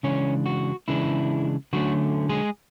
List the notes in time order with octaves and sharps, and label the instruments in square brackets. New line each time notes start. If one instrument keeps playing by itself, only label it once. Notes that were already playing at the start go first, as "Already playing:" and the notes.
[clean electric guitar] C#3 E3 G#3 C#4 D4 C#5
F#4
C#3 E3 G#3 D4 E4
D3 F#3 A3 C#4 F#4
G#3 G#4